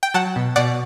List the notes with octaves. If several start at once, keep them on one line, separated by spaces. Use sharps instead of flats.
G5
F#3 F#5 A5
B2
B2 D5 F#5